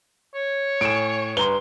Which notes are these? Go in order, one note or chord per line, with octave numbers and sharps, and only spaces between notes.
C#5
A2 G#5 D7 E7
G2 B4 A#5 C6 G7